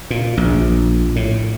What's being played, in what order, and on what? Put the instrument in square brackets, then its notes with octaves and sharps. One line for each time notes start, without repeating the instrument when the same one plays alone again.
[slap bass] A#2
A#1
A2